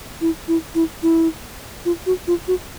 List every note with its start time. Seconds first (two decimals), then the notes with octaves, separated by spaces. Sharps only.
0.21 E4
0.48 E4
0.75 E4
1.03 E4
1.85 F4
2.06 F#4
2.27 F4
2.48 F#4